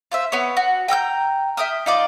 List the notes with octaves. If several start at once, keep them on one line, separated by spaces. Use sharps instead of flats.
F4 C5 E5
B3 C#5
F#4
G5 A#5 E6 G6
E5 G5 D#6 F6
D#4 F4 D5